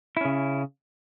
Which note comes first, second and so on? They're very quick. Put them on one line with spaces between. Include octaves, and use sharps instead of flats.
E4 C#4 C#3